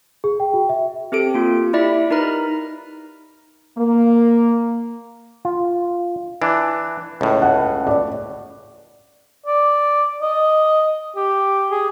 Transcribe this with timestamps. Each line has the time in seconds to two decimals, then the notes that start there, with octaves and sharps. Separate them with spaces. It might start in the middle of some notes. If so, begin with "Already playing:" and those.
0.24 G#4
0.40 G5
0.54 F#4
0.69 E5
1.12 C4 G4 A4 D7
1.34 A#3 F4
1.73 E4 G4 D5 E5 B5
2.10 D#4 A#4 B4 A#5 B5
3.77 A#3
5.45 F4
6.42 E3 D4
7.21 C#2 A2
7.42 F#5
7.87 D5
9.46 D5
10.22 D#5
11.16 G4
11.71 G#4